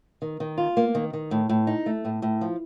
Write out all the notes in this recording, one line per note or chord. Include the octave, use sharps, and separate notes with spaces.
D#3
D#3
F4
A#3
D#3
D#3
A2
A2
D#4
A3
A2
A2
F3